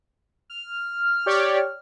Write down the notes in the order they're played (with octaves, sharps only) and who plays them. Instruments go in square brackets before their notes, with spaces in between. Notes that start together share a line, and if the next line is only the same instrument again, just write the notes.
[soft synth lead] F6
[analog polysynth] G4 C#5 D5